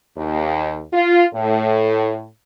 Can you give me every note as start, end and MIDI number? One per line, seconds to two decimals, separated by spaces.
0.16 0.83 39
0.93 1.27 65
1.34 2.25 45